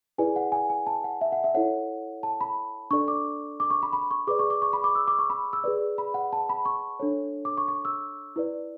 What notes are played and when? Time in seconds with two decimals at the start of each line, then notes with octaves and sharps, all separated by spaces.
0.18 E4 G#4 B4 D5 G#5
0.36 F#5
0.52 G#5
0.70 G#5
0.87 A5
1.04 F#5
1.21 E5
1.32 F#5
1.44 E5
1.54 E4 A4 C#5 F#5
2.23 A5
2.41 B5
2.91 D4 A4 D5 C#6
3.08 D6
3.60 D6
3.70 C#6
3.83 B5
3.93 B5
4.11 C#6
4.27 G#4 B4 D5 D6
4.39 C#6
4.50 D6
4.62 C#6
4.73 B5
4.84 D6
4.95 E6
5.08 D6
5.19 C#6
5.30 B5
5.53 E6
5.64 G#4 B4 D5
5.98 B5
6.14 F#5
6.33 A5
6.49 B5
6.65 C#6
7.00 D4 A4 C#5
7.45 D6
7.58 C#6
7.68 C#6
7.85 E6
8.36 E4 B4 D5